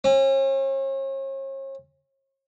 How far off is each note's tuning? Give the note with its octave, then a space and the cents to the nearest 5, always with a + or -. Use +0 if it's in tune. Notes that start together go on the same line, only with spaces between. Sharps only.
C#4 -40